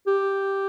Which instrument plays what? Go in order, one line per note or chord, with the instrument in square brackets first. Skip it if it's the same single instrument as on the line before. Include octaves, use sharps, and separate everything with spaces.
[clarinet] G4